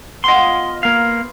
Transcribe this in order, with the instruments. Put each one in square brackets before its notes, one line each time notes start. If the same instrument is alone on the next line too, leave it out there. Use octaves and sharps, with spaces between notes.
[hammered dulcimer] B3 F4 [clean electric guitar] D#5 C6
[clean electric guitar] A#3 F5